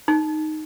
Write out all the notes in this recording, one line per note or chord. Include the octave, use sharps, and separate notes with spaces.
D#4